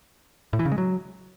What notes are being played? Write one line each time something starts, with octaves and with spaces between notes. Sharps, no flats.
A2
E3
C#3
G#3
F#3